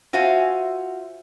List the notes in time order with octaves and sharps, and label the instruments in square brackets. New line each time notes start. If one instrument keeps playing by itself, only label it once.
[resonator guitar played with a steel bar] F4 F#4 C5 E5 G#5